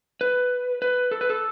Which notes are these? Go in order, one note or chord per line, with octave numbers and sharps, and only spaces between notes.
B4
B4
A4
B4
A4